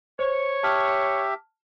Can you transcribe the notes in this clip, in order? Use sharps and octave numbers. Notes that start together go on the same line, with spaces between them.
C5 C#5
G4 E5 A5 F6